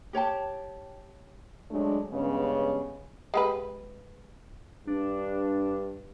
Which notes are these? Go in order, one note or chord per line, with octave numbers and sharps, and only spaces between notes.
G4 C#5 G5 A5
F#3 G#3 A3 D4
G2 C#3 G#3 B3 C#4
G#3 G4 B4
G2 D4